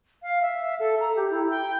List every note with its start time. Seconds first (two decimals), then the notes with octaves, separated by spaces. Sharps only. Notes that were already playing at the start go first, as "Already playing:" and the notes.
0.23 F5
0.42 E5
0.80 A4
1.00 A#5
1.16 G4
1.30 E4
1.50 G5